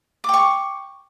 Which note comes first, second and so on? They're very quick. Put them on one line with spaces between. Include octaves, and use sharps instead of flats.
D6 G5 C#6